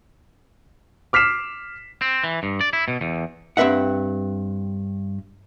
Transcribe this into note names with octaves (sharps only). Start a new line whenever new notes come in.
D6 F6 B6 C7 E7
C4
E3
G2
D5
E4
B2
E2
G2 C4 B4 E5 F#5